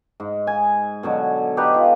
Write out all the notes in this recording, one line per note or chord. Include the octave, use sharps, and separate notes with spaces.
G#2
G#5
B2 D3 F#3
D#4 G4 A4 B4
F4